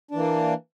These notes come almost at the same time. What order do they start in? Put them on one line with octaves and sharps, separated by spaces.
D4 E3 A#3